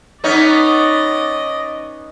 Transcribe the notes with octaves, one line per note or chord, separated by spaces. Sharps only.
B3 C#4 D#4 D5 D#5